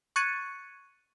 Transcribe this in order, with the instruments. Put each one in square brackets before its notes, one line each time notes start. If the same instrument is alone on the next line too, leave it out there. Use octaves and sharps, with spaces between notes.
[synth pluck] C#6 F#6 G#6 A6 C#7 D#7